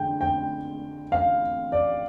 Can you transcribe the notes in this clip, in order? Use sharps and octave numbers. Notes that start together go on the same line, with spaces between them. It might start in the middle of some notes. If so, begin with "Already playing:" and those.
Already playing: D3 G#3 G5
G5
F5
D5